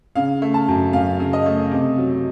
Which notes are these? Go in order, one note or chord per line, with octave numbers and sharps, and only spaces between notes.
C#3 F5
A3
A5
F#2
F#2 F5
C#3
D#5
A3
C3
F#3